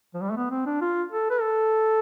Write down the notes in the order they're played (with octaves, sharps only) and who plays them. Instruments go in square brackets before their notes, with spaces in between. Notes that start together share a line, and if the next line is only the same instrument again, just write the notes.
[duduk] F3
G3
A3
B3
C4
D4
F4
A4
B4
A4